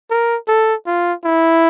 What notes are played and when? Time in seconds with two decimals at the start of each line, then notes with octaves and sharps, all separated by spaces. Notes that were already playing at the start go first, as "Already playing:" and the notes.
0.10 A#4
0.48 A4
0.86 F4
1.24 E4